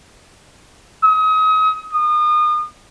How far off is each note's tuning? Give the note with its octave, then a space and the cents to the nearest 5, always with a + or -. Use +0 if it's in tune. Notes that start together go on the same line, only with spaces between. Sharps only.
D#6 +35
D#6 -35